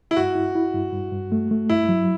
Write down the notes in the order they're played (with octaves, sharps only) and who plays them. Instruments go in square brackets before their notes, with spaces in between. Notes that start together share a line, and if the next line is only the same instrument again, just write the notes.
[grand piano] E4
[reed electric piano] G2 [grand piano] F#4
[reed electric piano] E4
E4
G2
G2
G2
A3
A3
[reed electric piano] G2 [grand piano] E4
[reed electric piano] F#3